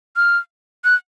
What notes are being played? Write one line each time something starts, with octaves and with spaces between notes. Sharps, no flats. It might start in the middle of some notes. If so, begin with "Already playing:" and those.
F6
F#6